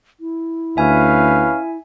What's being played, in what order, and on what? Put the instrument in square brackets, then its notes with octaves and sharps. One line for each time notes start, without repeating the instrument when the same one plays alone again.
[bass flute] E4
[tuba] D2 [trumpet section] C#4 B4 F5 [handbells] E5 G#5